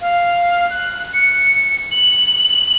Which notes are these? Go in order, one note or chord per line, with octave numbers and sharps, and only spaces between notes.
F5
F#6
C#7
F#7